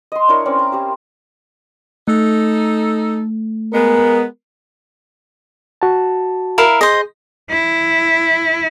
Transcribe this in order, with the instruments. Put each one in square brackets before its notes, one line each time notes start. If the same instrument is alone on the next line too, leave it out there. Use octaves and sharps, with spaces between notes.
[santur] D#5 C6
D4 E4 A#4 C#5
C4 C#4 C5 D5
A#5
C4 G4 C5
[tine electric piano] A3 [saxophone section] D#4 A4
[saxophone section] G#3 B3 [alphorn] A#4
[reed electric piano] F#4 A5
[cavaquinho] E4 A#4 F5
[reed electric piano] G#4 [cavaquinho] C5 D#5
[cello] E4